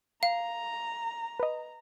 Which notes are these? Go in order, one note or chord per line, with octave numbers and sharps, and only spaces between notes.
F5 A#5
B4 D#5